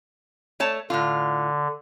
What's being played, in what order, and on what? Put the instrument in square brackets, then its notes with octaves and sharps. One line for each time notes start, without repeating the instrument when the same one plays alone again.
[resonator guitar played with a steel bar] A3 C#5 A5
[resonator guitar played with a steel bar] A2 F4 [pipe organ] D3